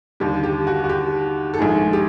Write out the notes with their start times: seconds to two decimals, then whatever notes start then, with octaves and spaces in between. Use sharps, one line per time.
0.20 D#2 D3 G3 G4
0.43 G4
0.67 F#4
0.84 F#4
0.89 G4
1.54 A4
1.58 A#1 G#2 D#3 G#4
1.93 G4